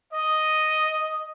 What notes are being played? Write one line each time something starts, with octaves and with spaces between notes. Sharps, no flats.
D#5